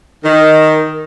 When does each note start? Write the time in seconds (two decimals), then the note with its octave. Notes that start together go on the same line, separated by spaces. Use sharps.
0.24 D#3